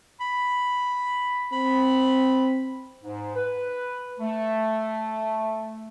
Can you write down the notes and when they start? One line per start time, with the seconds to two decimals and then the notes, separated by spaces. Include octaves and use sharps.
0.21 B5
1.53 C4 B5
3.03 G#2
3.36 B4
4.20 A3